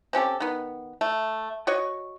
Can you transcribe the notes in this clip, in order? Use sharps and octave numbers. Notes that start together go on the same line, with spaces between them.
C4 C#4 G4 A4
D#3 B3
A3
F#4 C#5 D#5 C#6